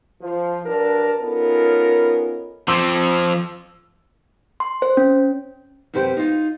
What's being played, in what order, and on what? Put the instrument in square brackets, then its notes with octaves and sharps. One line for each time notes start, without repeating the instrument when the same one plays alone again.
[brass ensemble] F3
G2 F#3 D4 A#4 B4 A5
B3 C#4 D#4 F4 A4 A#4
[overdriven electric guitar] F3 C4 [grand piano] C6 D6 E6
[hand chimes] C6
C5
C#4
[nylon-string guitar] F#2 C3 G4 B4 C5 G5
D#4 F4